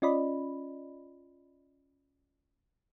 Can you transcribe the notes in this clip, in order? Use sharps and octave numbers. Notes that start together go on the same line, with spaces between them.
C#4 F4 D5 D#5 B5